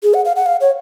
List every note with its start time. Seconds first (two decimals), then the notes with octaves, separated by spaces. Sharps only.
0.03 G#4
0.14 F#5
0.25 F5
0.36 F#5
0.46 F5
0.61 C#5